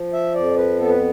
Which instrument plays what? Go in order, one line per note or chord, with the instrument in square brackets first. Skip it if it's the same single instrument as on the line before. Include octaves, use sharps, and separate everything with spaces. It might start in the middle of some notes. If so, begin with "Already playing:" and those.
Already playing: [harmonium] F3
E5
F2 D5
B4
B3 A4
B4